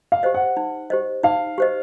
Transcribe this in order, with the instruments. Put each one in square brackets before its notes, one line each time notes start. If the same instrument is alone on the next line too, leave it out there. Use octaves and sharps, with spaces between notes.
[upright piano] F5
[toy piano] G4 C5 D#5
[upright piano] F#5
[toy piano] D#4
G4 C5 D#5
[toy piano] D#4 [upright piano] F5
[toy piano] G4 C5 D#5